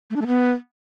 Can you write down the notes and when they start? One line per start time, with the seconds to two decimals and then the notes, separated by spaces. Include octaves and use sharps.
0.10 A3
0.16 D4
0.22 A3
0.27 B3